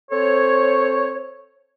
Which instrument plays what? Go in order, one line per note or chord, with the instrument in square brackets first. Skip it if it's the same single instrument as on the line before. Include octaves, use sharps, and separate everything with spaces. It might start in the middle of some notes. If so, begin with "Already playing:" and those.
[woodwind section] C4 A4 C5 C#5